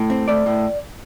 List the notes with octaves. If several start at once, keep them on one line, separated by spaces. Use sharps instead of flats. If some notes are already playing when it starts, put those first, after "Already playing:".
Already playing: A2
C4
A3 D5
A2